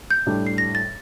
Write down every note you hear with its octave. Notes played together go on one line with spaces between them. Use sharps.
G6
A2 G3 D4
C7
A#6
A6